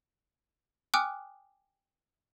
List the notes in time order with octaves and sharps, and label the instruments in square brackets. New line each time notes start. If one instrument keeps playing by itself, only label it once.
[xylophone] G5 G#5 D6 D#6 F6 F#6